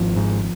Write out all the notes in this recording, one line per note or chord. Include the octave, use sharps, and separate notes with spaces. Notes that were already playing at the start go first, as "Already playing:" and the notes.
Already playing: G#1 F3
G#2